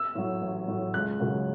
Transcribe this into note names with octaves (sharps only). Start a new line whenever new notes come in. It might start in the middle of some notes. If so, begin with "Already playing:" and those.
Already playing: E6
A2 F#3
A1
A2 F#3
C#2 F#6
C#3 F#3